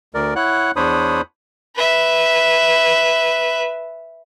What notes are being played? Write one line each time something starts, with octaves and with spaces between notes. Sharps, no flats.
D2 A#4 D5
E4 C#5 F#5 F#6
E2 D4 C5 C#5 B5 D#6
B4 E5